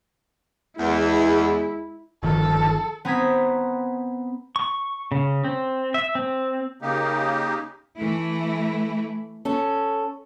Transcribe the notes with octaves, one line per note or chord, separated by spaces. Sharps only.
E2 G#3 E4
G1 D#3 F3 A4
B3 C4 A#5 D#6 G#6 B6
C#6
C#3
C4
E5
C4
C#3 A#3 D#4 G4
E3 A3 E4
C#4 A4